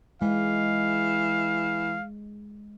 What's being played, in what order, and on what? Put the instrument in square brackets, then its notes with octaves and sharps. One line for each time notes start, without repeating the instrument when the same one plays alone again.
[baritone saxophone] E3 [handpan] G#3 [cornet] F5